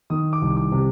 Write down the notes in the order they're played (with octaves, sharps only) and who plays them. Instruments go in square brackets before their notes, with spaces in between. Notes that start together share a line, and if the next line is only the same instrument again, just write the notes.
[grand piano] D#3 D#6
D6
C2
D6
C3